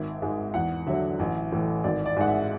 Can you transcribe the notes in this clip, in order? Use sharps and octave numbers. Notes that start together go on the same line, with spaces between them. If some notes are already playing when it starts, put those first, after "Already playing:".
Already playing: G#1 E5
G#2 G#3
E2 F#5
D3 F#3 E5
A1
A2 E3
G#1 D5
D5
G#2 G#3 F#5
E5